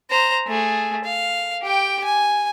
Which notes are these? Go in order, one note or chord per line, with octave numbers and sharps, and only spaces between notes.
C5 A#5
A3 G#4
F5
G4 G5
G#5